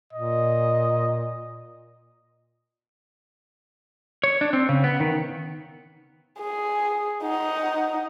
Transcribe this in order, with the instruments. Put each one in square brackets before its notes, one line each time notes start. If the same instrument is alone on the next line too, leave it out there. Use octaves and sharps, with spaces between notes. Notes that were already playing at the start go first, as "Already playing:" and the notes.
[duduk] A#2 [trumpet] D#5
[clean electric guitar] C#5
D4
C4
C#3
B3
D#3
[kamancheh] G#4
D#4 F#5